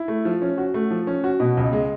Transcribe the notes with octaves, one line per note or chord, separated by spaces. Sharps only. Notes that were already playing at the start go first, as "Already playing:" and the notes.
Already playing: E4
A3
F3
C#4
F#4
A3
F3
C#4
F#4
B2
C#2
G#3